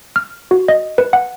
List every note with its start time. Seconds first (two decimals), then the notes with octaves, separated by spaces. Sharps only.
0.16 F6
0.51 F#4
0.68 D#5
0.98 B4
1.13 F#5